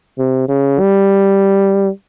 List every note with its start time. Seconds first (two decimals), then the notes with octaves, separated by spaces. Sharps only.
0.18 C3
0.48 C#3
0.79 G3